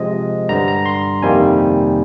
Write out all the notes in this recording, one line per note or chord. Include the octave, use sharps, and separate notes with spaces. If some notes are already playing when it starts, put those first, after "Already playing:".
Already playing: C3 F3 G#3 D#5
G2 D3 G3 A#5
A#5
C6
F2 C3 D#3 G3 A#3 G#5